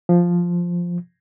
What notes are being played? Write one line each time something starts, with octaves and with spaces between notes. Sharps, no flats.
F3